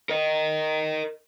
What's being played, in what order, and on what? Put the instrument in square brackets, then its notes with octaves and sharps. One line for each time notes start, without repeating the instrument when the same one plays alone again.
[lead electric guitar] A#4 D#5